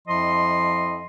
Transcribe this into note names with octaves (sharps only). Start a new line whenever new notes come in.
F2 F3 E4 D#5 C6